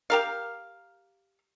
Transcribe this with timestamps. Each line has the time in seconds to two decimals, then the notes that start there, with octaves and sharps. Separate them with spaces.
0.10 G4 A#4 F5